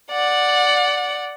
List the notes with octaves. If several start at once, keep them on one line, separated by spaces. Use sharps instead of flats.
D5 F#5